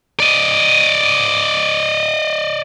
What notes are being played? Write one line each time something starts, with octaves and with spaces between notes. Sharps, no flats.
D5 D#5